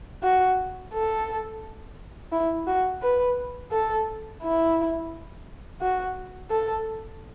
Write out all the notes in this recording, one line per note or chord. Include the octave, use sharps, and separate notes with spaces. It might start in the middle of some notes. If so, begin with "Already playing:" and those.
F#4
A4
E4
F#4
B4
A4
E4
F#4
A4